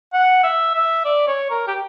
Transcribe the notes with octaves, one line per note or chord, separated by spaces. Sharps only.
F#5
E5
E5
D5
C#5
A#4
G4